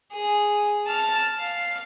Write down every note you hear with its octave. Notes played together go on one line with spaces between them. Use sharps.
G#4
A5 F6
F5